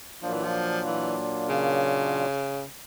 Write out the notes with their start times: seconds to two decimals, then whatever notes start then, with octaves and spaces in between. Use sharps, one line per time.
0.22 A#2 F3 F#3 A#3 D4 F4
0.33 E3
0.44 F3
0.86 E3
1.49 C#3